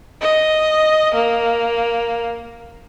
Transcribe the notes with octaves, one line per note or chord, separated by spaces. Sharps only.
D#5
A#3